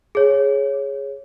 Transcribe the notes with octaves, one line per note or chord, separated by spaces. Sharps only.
G#4 C#5